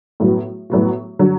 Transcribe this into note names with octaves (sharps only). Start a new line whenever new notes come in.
A2 F#3 B3 F#4
A2 F#3 B3 F#4
D3 F#3